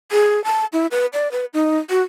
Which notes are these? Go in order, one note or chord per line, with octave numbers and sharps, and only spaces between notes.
G#4
A5
E4
B4
D5
B4
D#4
F#4